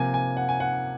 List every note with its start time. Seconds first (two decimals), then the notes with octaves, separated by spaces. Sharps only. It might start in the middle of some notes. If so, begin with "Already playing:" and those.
Already playing: C3 F3 A#3 G#5
0.14 G#5
0.37 F#5
0.49 G#5
0.60 F#5